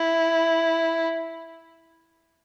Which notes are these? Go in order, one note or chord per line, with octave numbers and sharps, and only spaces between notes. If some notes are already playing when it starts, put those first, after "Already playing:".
Already playing: E4